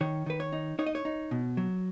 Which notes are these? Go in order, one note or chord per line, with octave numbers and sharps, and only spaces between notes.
D#3 C#5
D#3 B4
C#5
D#4
D#4 C#5
D#5
C#5
D#4
B2
F#3